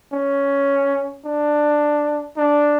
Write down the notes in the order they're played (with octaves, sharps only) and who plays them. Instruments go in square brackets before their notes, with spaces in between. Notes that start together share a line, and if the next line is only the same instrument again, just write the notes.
[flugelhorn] C#4
D4
D4